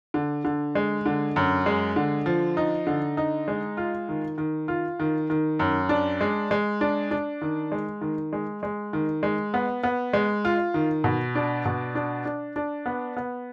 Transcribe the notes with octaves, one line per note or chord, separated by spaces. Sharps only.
D3
D3
G#3
D3
F#2
G#3
D3
F3
D#4
D3
D#4
G#3
F4
D#3
D#3
F4
D#3
D#3
F#2
D4
G#3
G#3
D4
D4
D#3
G#3
D#3
G#3
G#3
D#3
G#3
B3
B3
G#3
F4
D#3
B2
D4
B2
D4
D4
D4
B3
B3